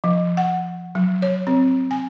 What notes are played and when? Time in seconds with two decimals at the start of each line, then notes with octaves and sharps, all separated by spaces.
0.04 F3
0.37 F#5
0.95 F#3
1.22 C#5
1.47 C4
1.91 G#5